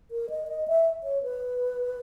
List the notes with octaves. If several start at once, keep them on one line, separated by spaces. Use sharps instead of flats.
A#4
D#5
D#5
E5
C#5
B4